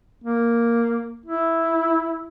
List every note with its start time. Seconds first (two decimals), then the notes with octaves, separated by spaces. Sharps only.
0.24 A#3
1.26 E4